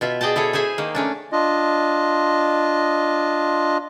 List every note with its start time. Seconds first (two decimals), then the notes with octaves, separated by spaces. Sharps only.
0.01 B2 F4 E5
0.21 G#4 D5 D#5 G5 A5
0.36 E4 G#4 A4 C#5
0.53 G#4 C5 E5 G#5
0.78 D#3 A#3
0.95 A3 C#4 D4
1.32 D4 F4 D#5